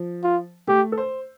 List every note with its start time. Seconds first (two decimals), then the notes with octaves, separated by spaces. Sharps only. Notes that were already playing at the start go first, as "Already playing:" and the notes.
Already playing: F3
0.24 F4
0.68 A3 G4
0.92 A4
0.98 C5